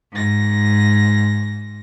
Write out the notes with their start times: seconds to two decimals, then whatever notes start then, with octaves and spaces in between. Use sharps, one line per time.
0.11 G#2 A#6